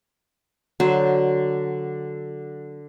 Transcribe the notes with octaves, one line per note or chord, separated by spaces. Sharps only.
D3 F#3 C5